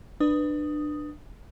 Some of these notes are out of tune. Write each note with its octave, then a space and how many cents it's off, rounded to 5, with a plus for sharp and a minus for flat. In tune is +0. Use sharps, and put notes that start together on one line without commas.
D4 +25 B4 +0 D#6 +0